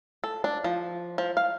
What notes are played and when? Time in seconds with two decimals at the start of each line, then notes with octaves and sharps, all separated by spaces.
0.24 A4
0.44 D4
0.64 F3
1.18 F3
1.37 F5